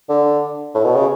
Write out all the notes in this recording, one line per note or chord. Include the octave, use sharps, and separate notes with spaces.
D3
A2
B2
C#3